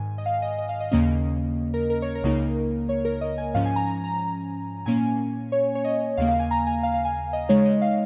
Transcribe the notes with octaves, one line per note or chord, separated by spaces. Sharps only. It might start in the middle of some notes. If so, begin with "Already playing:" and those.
Already playing: G#2 D#3 G#5
D#5
F5
D#5
D#5
F5
D#5
D#2 C#3 A#3 C#4 D#5
A#4
A#4
C#5
A#4
C#2 C#3 A#3 D#4
C#5
A#4
D#5
G#5
G#2 F3 C#4 F5
G#5
A#5
A#5
A#5
A#2 A#3 C#4 G#5
C#5
C#5
D#5
D#2 C#3 A#3 F5
F5
G#5
A#5
G#5
F5
F5
G#5
D#5
C#3 G#3 D#4 C#5
D#5
F5